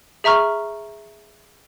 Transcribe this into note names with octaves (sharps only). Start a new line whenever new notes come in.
G#4 E5 A#5 C#6 F6